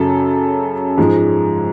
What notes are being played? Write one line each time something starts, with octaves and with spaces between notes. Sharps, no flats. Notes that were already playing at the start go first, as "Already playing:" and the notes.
Already playing: F#2 C#3 F#3 A4
G#2 F3 G#3